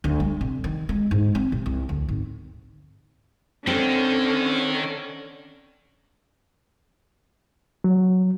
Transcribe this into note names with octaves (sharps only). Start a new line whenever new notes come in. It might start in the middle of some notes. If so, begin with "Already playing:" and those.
D2
G3
C3
D#3
G#3
G#2
C4
C3
C2
D2
G#1
D3 D#3 C4 C#4
F#3